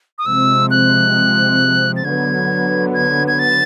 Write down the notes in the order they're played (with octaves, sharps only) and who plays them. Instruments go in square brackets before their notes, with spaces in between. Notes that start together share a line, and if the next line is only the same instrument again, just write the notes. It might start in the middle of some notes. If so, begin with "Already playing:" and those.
[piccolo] D#6
[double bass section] C3 F3 G#3 C4 [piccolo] E6
[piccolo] F#6
A6
[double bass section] D3 F#3 B3 [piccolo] G#6
[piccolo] G#6
G#6
A6